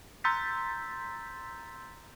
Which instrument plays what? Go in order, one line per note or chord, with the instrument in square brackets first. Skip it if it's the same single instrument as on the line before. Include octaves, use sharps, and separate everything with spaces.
[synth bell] A#5 C6 E6 G6 A6 B6